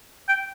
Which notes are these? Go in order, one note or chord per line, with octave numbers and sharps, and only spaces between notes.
G5